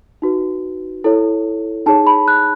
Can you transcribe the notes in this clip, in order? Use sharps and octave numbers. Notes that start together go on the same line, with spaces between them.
D#4 F#4 B4
E4 A4 C#5
D#4 G#4 C#5 A5
B5
F#6